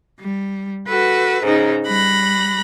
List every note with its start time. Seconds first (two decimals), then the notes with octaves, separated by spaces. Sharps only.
0.20 G3
0.88 F#4 A4 B4
1.43 G#2 C#3 D#4
1.86 G3 B5 F#6 A#6